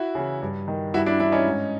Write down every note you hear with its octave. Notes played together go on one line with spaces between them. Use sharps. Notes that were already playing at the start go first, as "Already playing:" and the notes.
Already playing: E4 F#4
C#3 E3
G2
D#3
G2 E4 F#4
D4 E4
E3 D4 E4
C#4 D#4
G#2